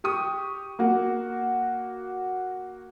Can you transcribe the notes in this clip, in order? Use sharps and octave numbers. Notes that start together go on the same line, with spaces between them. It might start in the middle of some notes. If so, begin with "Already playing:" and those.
G4 C#6 D#6
A#3 F#4